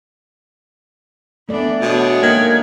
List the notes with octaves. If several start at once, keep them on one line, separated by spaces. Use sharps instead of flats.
E3 A3 B3 D4 D5
B2 G#3 D4 C#5
D#3 A#3 G#6